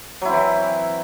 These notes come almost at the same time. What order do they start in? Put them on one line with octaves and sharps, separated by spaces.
F#3 E4 C4 E3